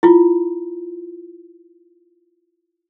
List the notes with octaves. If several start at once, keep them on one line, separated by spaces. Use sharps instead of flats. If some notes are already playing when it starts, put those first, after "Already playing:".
E4 F4